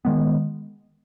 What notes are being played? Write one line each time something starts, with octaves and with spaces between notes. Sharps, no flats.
D#3 G#3 B3